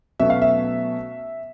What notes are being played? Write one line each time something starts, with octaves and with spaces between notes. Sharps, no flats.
B2 F#3 A3 C#4 E5
F5
E5